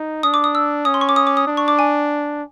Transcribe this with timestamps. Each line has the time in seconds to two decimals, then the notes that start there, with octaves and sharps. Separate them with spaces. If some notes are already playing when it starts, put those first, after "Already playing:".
Already playing: D#4
0.23 D4 D#6
0.34 D6
0.44 D#6
0.55 E6
0.85 C#4 D#6
0.94 C6
1.01 C#6
1.09 D6
1.16 D#6
1.27 D6
1.37 D#6
1.47 D4
1.57 C#6
1.68 D6
1.79 G#5